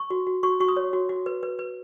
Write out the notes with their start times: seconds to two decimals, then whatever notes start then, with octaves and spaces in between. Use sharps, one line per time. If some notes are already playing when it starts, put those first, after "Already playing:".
Already playing: C#6
0.10 F#4
0.27 F#4
0.43 F#4 C#6
0.60 F#4 C#6
0.68 D#6
0.77 C#5
0.93 F#4
1.09 F#4
1.26 B4
1.43 B4
1.59 B4